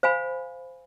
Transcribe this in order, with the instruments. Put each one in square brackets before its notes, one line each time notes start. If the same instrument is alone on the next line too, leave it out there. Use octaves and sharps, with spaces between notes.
[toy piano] C5 F5 G#5 B5